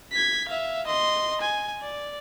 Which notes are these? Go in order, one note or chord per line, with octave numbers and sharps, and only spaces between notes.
G#6 B6
E5 F5
D#5 C6
G#5
D5